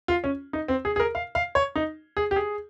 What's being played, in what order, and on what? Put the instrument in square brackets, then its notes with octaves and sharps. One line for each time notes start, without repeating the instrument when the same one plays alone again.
[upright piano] F4
C#4
D#4
C4
G#4
G#4
A#4
F5
F5
C#5
D#4
G#4
G4
G#4